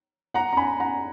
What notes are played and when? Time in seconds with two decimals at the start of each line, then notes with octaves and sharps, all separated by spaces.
0.34 F#5 A#5
0.53 A#5
0.57 G#5 B5
0.80 F#5 A#5